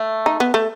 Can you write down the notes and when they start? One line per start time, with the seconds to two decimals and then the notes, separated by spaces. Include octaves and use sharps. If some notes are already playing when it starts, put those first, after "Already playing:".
Already playing: A3
0.26 D#4
0.40 B3
0.54 A3